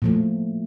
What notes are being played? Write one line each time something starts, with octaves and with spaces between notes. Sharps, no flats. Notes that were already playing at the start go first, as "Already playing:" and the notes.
A#2 F3 A3